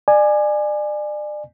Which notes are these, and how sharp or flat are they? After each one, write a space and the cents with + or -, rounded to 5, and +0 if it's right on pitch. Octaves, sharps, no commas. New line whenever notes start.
D5 +30 G#5 +0